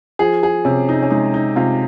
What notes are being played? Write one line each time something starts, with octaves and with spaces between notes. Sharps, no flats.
F3 G#4
G#4
C3 C#4
D#4
C#4
G#3 D#4
D#4
C3 F4